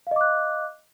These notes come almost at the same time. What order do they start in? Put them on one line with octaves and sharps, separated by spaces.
F5 D#5 D6 F#6